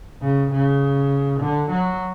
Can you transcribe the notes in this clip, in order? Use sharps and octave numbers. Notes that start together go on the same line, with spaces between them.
C#3
C#3
D3
F#3